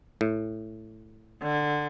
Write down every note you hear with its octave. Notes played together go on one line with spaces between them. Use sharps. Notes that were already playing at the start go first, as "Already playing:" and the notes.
A2
D3